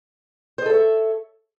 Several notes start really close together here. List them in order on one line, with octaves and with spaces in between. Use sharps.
C5 D#5 A4 E5 C#5